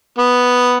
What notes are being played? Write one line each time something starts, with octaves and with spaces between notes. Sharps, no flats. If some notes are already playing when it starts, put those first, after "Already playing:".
B3